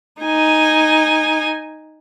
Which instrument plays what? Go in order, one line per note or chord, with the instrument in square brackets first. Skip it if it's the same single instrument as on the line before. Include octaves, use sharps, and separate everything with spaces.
[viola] D#4 G#5